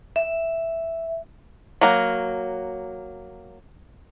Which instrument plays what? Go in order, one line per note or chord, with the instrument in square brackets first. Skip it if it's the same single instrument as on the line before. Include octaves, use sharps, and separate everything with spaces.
[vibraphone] E5
[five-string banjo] F#3 A#3